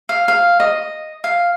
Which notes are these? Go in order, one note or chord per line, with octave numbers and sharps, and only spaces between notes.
F5
F5
D#5
F5